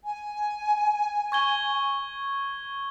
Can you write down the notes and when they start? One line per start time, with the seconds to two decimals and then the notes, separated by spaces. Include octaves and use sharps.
0.03 G#5
1.32 C#6 G#6 G7